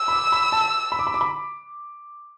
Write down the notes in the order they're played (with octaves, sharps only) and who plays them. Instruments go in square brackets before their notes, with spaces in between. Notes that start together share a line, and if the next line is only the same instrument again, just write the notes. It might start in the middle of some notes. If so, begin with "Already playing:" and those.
Already playing: [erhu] E6
[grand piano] B5
D6
B5
A5
B5
D6
B5
D6
B5